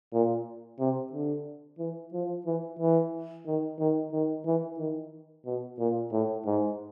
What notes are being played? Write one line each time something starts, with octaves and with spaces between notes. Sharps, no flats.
A#2
C3
D3
E3
F3
E3
E3
D#3
D#3
D#3
E3
D#3
B2
A#2
A2
G#2